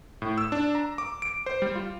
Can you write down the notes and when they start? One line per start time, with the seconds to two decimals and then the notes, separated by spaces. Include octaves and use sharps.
0.22 A2
0.38 E6
0.52 D4
0.75 A#5
0.98 D6
1.22 D7
1.46 C5
1.62 G3
1.75 F4